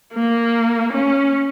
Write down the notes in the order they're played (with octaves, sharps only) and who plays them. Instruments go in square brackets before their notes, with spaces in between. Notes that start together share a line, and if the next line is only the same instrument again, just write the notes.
[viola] A#3
C#4